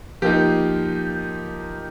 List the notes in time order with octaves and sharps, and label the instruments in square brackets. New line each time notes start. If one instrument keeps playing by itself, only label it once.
[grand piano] F3 A#3 D#4 G4